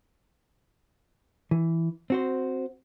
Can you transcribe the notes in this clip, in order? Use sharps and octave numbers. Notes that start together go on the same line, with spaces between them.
E3
C4 F#4 C5